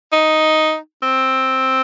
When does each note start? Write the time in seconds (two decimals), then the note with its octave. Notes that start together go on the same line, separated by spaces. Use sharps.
0.13 D#4
1.03 C4